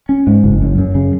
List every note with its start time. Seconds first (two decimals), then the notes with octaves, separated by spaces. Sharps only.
0.09 C#4
0.27 G#2
0.44 F#1
0.62 F#2
0.78 F#2
0.95 C#3